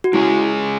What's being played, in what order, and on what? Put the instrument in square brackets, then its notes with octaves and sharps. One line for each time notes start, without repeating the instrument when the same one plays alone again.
[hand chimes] F#4
[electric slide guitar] G#3 C#4 G#4 [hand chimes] E4